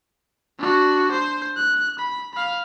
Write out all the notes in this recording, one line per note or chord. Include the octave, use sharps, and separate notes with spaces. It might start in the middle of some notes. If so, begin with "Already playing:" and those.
D4 F#4
C5
F#6
B5
F5 B5